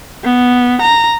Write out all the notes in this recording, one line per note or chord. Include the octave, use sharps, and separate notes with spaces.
B3
A#5